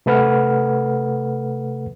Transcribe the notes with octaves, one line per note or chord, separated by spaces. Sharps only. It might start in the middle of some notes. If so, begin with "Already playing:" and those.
C3 A3 A4 B4 F#5 F6